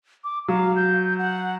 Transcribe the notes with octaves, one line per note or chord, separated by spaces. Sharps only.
D6
F#3 F5
G6
F#5